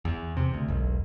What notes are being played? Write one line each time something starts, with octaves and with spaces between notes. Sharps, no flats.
E2
C3
D2
E1 B1